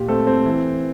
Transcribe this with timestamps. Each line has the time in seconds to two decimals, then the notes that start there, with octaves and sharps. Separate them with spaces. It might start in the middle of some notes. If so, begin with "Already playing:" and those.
Already playing: A#2 G4
0.08 A3 C4 A4
0.27 C4
0.46 E3